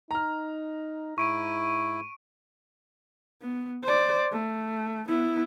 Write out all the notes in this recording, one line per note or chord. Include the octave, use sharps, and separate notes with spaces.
D#4 A#5 F6
G#2 E4 C#6 D7 D#7
B3
C5 D5
A3
B3 E4